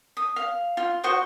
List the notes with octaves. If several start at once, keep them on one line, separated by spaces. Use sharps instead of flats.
D#6
F5
F4
F#4 C5 C#6 D#6